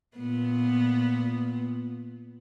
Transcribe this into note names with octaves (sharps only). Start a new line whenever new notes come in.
A#2 B3